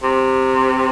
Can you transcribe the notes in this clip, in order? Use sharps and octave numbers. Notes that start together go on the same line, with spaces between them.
C3